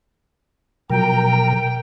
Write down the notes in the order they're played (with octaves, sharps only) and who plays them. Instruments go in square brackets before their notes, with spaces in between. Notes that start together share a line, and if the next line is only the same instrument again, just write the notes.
[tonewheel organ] B2 A#4 A#5 [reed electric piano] F3 F#3 [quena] G5